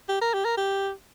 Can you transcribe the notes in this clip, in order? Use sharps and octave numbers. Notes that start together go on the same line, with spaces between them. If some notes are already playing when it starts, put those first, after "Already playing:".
G4
A#4
G4
A#4
G4